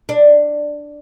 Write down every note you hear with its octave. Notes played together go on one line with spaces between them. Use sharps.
D4